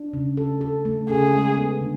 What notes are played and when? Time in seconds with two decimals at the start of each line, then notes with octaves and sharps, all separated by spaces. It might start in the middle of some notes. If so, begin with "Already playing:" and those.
Already playing: D4
0.13 C#3
0.37 A4
0.61 A4
0.85 A3
1.10 C#3 G#4
1.34 G#3
1.57 B3
1.81 D3